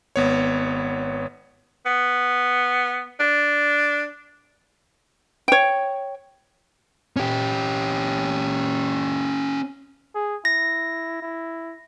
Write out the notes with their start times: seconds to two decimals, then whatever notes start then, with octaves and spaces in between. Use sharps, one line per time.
0.16 G#1 B3 C#5
1.86 B3
3.20 D4
5.48 C#5 G5
7.16 C#4 G4
10.15 G#4
10.45 E4 A#6
11.22 E4